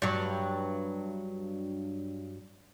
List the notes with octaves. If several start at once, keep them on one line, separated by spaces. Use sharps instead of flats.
G2 F#3